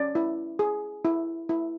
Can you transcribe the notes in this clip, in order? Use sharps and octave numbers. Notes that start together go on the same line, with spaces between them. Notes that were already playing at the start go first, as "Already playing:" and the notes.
Already playing: C#4 D5
E4
G#4
E4
E4